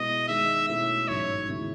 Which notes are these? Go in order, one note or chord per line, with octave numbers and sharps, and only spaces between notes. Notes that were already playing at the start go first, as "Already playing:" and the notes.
Already playing: B2 G#3 B3 E4 D#5
D#3 G#3 D#4 E5
B2 A3 C#4 E4 E5
A1 G#2 F#3 C#4 C#5
D#2 C#3 G#3 B3 E4